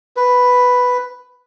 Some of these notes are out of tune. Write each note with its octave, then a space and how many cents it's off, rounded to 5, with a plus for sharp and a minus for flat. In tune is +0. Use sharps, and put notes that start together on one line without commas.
B4 +5